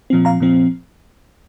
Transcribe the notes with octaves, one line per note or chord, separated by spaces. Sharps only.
A#2 F3 C4
F5 A#5
A#2 F3 C4